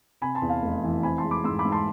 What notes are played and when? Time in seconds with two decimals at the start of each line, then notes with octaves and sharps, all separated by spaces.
0.21 C3 G#5 B5
0.35 A5 C6
0.42 E2
0.49 F5 A5
0.62 F1
0.84 E3
1.03 C4 G#5 B5
1.18 A5 C6
1.24 G#3
1.31 B5 D6
1.44 G#2 C6 E6
1.59 B5 D6
1.65 G#2
1.72 A5 C6